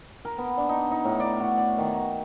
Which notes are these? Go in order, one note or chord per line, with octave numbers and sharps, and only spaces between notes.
A#4
B3
D4
D#4
D#4
A2
D5
F#4
D5
D#3
A#5